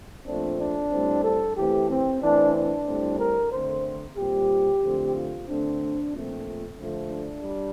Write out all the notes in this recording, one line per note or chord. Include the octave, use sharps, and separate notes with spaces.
A#2 F3 A3 C4 D4
D4
A2 G3 C4
A4
E3 A3 C4 G4
C4
E3 A3 C4 D4
D4
A2 G3 C4
A#4
D3 A3 C4 C5
A#2 G3 C4 G4
D3 F3 A3 C4
F4
D3 A3 C4 D4
A#2 F3 A3 C4
D3 F3 A3
D4
G3